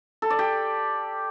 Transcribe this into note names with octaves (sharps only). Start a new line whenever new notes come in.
A4
D5
G4